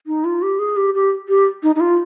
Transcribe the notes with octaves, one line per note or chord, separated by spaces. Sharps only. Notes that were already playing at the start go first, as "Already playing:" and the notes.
D#4
F4
G4
G#4
G4
G4
G4
D#4
D#4
F4